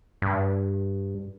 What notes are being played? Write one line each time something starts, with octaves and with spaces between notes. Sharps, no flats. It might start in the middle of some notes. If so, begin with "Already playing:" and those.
G2